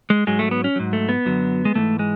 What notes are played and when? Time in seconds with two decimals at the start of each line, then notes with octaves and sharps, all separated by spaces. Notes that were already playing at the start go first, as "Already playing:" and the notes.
0.10 G#3
0.27 G#2 F#3 G#3
0.39 A3
0.51 B3
0.64 C#4
0.76 G#2 F#3
0.93 A3
1.09 B3
1.25 F#2 D3 F#3
1.65 G#3
1.75 G#2 E3 A3
1.99 G#3